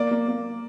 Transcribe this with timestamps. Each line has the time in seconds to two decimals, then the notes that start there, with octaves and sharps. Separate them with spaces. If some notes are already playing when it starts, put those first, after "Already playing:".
Already playing: A#3 D5
0.11 A#3
0.28 A#3